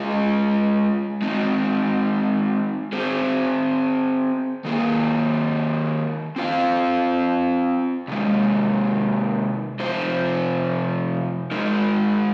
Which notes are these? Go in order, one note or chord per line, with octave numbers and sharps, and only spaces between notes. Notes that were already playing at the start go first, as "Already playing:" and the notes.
Already playing: G#3 F4 G#4 D#5
G#3 C4 D#4
C4 G#4 C5
D#3 A#3 G#4
C4 F4 C5 F5
C3 D#3 G#3
C3 F3 C4 F4 C5
G#3 D#4 A#4